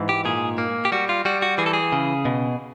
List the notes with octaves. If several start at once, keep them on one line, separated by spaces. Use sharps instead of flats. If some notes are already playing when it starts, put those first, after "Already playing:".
Already playing: G#2 E3
G4
A#2 G#4
A#3
G4
G3 F#4
F4
G3 F#4
F#4
E3 G#4
A4
G#4
C#3
B2